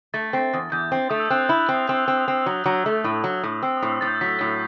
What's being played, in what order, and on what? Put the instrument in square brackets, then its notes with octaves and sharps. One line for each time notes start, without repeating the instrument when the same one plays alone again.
[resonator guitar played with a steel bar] A3 [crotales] A6
[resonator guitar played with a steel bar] C4
E2
[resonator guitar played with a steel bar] E2 [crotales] G6
[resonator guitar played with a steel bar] C4
[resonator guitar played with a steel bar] A3 [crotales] D#6
[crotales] E6
[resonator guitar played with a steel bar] C4 [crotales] F#6
[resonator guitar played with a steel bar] E4 [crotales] G6
[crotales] F#6
[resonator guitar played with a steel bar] C4
[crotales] D#6
[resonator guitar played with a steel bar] C4 [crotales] E6
[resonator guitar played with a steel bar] C4 [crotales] E6
[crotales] D#6
[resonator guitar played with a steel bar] C4
[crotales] E6
[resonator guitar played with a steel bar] F#3 [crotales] D#6
[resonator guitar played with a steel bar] F#3
A3
A2
F#3
A2
[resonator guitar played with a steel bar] C4 [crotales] E6
[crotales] D#6
[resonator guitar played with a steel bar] A2
[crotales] E6
[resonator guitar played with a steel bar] A2 [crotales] A6
[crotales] G6
[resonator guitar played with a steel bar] F#3 [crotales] B6
[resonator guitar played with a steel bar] A2